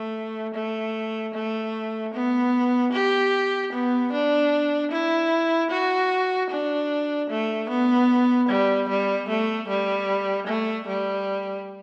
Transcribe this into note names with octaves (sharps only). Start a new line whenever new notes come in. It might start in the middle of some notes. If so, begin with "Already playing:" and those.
Already playing: A3
A3
A3
B3
G4
B3
D4
E4
F#4
D4
A3
B3
G3
G3
A3
G3
A3
G3